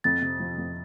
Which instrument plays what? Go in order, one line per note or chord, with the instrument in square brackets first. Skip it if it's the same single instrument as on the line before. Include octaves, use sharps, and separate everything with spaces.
[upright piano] F2 [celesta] A6
[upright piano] C3
F3
F2